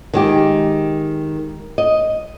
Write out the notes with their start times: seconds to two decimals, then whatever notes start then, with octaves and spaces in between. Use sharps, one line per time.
0.14 D#3 G#3 G4
1.78 D#5